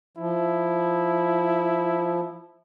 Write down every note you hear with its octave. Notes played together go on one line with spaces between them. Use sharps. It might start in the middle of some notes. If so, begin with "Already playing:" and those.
F3 E4